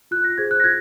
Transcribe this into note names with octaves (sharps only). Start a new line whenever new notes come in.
F4 F#6
A#6
G#4 C5 G#6
F#6
A#6
F4 G#6